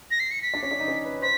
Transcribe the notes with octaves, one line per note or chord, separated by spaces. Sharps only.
A#6
C7
C#7
B6
D4 D5
C#4 C#5
D4 D5
D#4 D#5
C#4 C#5
B4
C5 B6